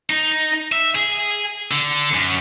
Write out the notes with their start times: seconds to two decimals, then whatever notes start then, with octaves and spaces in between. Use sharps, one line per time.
0.10 D#4
0.72 E5
0.95 G#4
1.71 D3
2.14 F#2